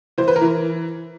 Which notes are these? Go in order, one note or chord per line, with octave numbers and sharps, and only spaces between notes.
E3 C5
B4
A#4
E3